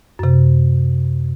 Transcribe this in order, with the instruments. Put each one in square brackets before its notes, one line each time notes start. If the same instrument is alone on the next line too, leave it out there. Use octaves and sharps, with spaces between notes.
[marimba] F#2 C3